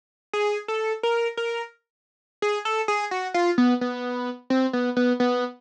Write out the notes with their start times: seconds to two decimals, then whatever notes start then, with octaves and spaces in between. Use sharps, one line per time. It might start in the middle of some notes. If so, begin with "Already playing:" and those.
0.33 G#4
0.68 A4
1.03 A#4
1.37 A#4
2.42 G#4
2.65 A4
2.88 G#4
3.11 F#4
3.34 F4
3.58 B3
3.81 B3
4.50 C4
4.73 B3
4.96 B3
5.20 B3